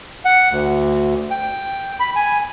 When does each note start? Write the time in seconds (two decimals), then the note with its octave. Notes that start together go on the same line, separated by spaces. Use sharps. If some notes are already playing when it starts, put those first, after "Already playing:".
0.25 F#5
0.51 D2
1.31 G5
2.00 B5
2.16 G#5